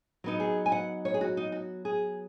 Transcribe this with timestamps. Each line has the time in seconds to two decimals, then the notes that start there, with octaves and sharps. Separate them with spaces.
0.24 F#3 B3 D#4
0.40 G#4
0.66 G#5
0.72 F#5
1.05 C#5
1.14 G#4
1.21 F#4
1.37 D#4
1.52 F#4
1.85 G#4